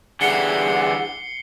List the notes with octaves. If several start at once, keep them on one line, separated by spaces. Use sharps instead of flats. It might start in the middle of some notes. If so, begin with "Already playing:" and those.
D3 E3 G3 G#4 F#5 C7 C#7 G7